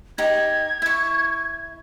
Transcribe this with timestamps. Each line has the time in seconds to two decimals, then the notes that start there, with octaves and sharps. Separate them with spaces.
0.18 D#4 G4 G#6
0.82 E4 C#6